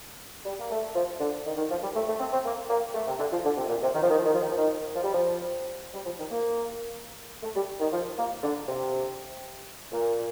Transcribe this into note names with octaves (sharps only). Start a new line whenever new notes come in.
G3
A#3
A3
F3
D3
D#3
D#3
F3
G3
A3
A3
C4
C4
A#3
A#3
A3
C3
D3
F3
D3
C3
A#2
C3
D#3
F3
D#3
F3
D#3
F3
D#3
F3
D#3
F3
G3
F3
G3
F3
D#3
A#3
A3
G3
D#3
F3
A#3
D3
C3
A#2